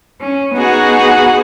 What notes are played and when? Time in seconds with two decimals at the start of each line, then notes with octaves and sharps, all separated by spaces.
0.22 C#4
0.54 B3 D#4 F#4 G#4 F#5